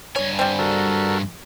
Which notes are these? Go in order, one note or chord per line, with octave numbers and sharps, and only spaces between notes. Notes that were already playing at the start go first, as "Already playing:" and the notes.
G2 C#5 G#5
G3 C4
F#4 A4 A#4